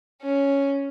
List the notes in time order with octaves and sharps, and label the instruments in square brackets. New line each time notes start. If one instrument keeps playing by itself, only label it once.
[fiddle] C#4